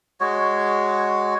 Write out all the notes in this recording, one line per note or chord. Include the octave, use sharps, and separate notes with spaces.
G#3 F#4 C#5